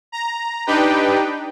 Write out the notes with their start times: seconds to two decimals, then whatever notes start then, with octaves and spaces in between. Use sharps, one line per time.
0.12 A#5
0.66 D4 D#4 G4 B4 G5